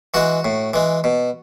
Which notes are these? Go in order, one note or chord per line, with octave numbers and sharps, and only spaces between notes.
E3 G#3 F#4
A2
E3 G#3
B2